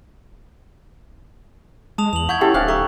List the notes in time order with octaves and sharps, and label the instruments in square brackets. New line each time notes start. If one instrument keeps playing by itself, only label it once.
[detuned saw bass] G#3 [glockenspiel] A5 D#6 F7
[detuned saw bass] E2 [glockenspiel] F7 F#7
[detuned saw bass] E4 [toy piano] F#5 [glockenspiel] C#6 G6 G#6
[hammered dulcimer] C#4 A4 [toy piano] G4 F#5 G5
[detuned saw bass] D1 [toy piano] D#4 C5 G#5 [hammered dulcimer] G4 E5 F5 [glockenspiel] F#6
[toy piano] A4 [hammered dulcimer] E5 [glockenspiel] A#5 C#6